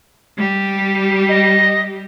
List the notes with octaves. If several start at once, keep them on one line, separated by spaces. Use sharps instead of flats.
G3 G4
D#5